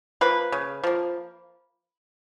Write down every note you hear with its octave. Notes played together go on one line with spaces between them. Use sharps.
F3 A#3 B4
C#3
F3 A#3